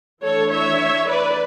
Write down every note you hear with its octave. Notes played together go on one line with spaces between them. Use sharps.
E3 A3 D4 A4 C#5
C#5 E5
B4 D5